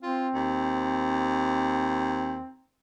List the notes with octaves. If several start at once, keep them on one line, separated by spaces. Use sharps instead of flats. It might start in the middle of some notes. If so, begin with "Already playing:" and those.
C4 F4
D#2